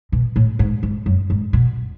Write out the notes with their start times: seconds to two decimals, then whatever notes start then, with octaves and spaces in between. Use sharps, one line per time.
0.12 B2
0.36 A2
0.59 G#2
0.83 G#2
1.06 F#2
1.30 G#2
1.53 B2